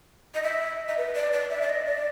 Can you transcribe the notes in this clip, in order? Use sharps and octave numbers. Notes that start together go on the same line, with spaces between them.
D#5
E5
D#5
B4
D5
D5
E5
D5
D#5
D5